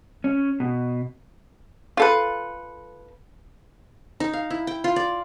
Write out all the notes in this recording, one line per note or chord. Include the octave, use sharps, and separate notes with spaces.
C#4
B2
F4 A4 B4
D#4
F5
E4
G5
F4
D5